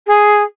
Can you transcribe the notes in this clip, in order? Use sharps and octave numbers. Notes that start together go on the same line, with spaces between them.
G#4